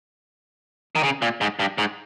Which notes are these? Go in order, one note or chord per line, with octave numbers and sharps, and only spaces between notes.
D#3
C#3
A#2
G#2
G2
G#2